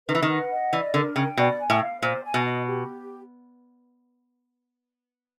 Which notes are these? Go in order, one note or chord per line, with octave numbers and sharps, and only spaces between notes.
D#3 B4
E3
D#3
F#5
D#5
E3 D5
D3 A#4
C#3 G5
B2 D5
G#5
A2
F5
A#2 C5
G#5
B2
D#5
G4